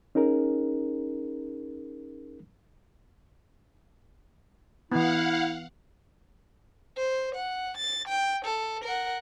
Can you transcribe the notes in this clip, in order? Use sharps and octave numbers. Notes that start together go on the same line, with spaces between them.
C#4 D#4 G#4 A#4
E3 B3 E4 F5 F#5
C5
F#5
A6
G5
A4
A#4 F#5